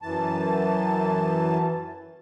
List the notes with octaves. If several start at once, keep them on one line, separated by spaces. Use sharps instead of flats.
F#2 E3 A5